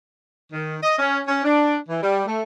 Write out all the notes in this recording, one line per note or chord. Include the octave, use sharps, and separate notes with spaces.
D#3
D#5
C#4
C#4
D4
E3
G3
A3